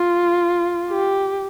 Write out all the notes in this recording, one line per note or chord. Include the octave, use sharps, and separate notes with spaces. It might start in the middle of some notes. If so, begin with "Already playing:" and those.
Already playing: F4
G4